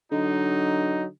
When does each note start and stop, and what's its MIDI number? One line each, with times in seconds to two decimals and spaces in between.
0.12 1.09 50
0.12 1.03 54
0.12 1.03 63